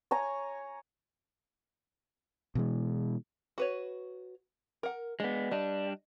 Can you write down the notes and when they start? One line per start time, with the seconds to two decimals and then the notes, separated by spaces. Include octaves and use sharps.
0.11 C#5 G#5 A#5
2.55 B2 E3 G#3
3.58 F#4 B4 C#5
4.83 A#4 F#5
5.20 G#3 B3 D4
5.51 G3 D4 D#5